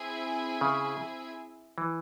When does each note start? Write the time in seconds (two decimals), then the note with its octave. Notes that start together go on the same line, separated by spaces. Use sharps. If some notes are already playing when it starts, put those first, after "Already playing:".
Already playing: C4 E4 G#4 E5 G#5
0.61 C#3
1.78 E3